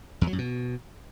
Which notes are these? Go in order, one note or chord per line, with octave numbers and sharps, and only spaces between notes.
E2
F#3
F#2
B2